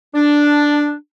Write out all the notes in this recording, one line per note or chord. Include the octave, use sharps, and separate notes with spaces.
D4